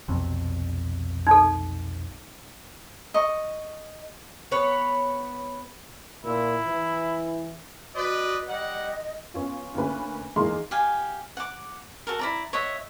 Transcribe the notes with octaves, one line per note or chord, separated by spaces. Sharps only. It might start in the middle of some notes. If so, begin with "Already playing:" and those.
B1 F2 C3
D#4 A4
D#5 C#6
B3 B4 C#5
A#2 E4
E3
F#4 B4 D5 D#5
G3 D#5 F#5
B3 C#4 F4
D2 A#3 C#4 B4
E2 G#3 A#3 D#4 C6
G4 F5 G#5
F#5 D6
F#4 A4 A#4
E4 D5 A#5
C#5 D#5 E5 F#5